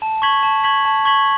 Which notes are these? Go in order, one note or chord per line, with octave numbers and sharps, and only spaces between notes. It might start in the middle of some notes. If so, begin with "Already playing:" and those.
A5
C#6 G#6 B6 F#7
A5
C#6 G#6 B6 F#7
A5
C#6 G#6 B6 F#7